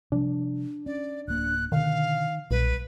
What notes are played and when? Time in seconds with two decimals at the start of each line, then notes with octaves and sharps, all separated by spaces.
0.12 C3 F3 G3 D4
0.86 C#4 D5
1.28 D1 A#3 F#6
1.72 B2 D3 D#3 F5
2.51 B1 A#2 G3 B4